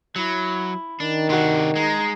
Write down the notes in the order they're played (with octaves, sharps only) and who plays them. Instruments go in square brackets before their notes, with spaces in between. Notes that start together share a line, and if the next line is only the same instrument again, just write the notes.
[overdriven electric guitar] F#3 [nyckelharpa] E4
[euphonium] D#3 [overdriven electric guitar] D4
[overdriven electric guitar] C3 D4 [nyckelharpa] F#4
[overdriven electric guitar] G#3 [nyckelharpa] D#4 A#5